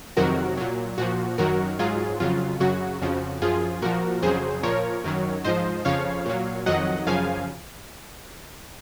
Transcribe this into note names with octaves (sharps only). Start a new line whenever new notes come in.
F2 C3 D#3 F#3 F#4 A#4
A#2 F#3
A#2 F3 F#4
F#2 D#3 F#3 F#4 A#4
G#2 F#3 F4 G#4
F2 C#3 F#3 F4
F#2 C#3 F#3 F#4
F2 C#3 F3
F#2 F3 F4 G#4
A#2 F3 F#4 A#4
F2 C#3 F#3 G#4 C5
A#2 F3 A#4 C#5
F#2 D#3 F#3
G#2 F3 C5 D#5
F2 C#3 F3 C#5 F5
A#2 F#3
F2 D#3 F#3 D#5 F#5
F#2 C#3 F3 F5 G#5